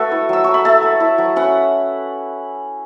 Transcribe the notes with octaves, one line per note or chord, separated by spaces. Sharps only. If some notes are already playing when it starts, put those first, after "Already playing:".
Already playing: A3 F#4 A4 B4 E5 A5 C#6
E4
F#3 E6
F#3 C#6
B5
A3 E5 A5
A3
E4
F#3
C#4 F#5 B5